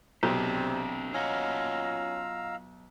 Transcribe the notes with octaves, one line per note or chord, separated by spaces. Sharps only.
B1 C3 C4 D4 G4
C#4 F4 D#5 F5 F#5 A#5 E6